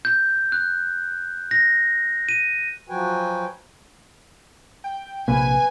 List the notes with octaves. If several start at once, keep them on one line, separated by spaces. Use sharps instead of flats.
G6
F#6
A#6
D#7
F3 F#3 F#4 B4 G5 G#5
G5
A#1 C3 A#3 B4 G#5